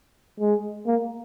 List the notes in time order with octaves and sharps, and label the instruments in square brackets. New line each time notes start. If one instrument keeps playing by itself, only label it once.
[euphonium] G#3
A#3